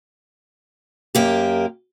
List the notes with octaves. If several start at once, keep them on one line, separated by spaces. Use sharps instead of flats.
F#2 A#3 G4